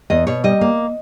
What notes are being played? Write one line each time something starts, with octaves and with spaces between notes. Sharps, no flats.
E2 D#5
B2 C#5
G3 D#5
A#3